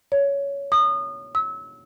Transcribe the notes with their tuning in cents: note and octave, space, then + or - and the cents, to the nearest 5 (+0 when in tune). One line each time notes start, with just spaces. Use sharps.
C#5 +15
D#6 -30
E6 -30